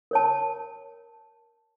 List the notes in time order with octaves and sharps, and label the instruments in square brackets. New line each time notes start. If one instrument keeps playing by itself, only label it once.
[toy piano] A#4 C#5 A5